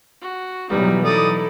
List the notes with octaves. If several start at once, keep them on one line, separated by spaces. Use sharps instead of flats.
F#4
B2 E3 F#3 G3 D#4 B4
D#4 E4 A4 D5 D#6